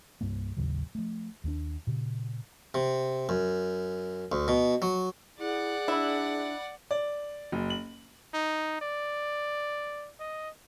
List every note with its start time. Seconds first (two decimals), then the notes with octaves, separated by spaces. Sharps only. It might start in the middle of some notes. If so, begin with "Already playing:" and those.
0.21 C2 G2 G3 A#3
0.57 A1 D#2 C#3 F#3
0.95 F3 A3
1.44 D#2 G#3 D4
1.87 A#2 C#3
2.74 C3
3.29 F#2
4.32 D2
4.48 B2
4.82 F#3
5.39 E4 G#4 D5 F#5
5.88 D4 E4
6.91 D5
7.52 F#1
7.70 F#7
8.34 D#4
8.81 D5
10.20 D#5